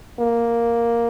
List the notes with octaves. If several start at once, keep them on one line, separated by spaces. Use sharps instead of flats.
A#3